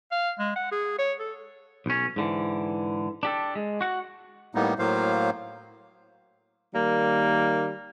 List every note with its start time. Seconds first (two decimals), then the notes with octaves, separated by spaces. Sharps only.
0.11 F5
0.39 G#3
0.56 F#5
0.72 G#4
0.99 C#5
1.19 A4
1.86 B1 C#4
2.16 G#2 D3 E3
3.23 D4 G4 A4
3.56 G#3
3.81 F#4 F#5
4.55 A2 G3 A#3 B3 D#4
4.79 A2 F#3 A#3 C5 F5
6.75 D#3 G3 A#3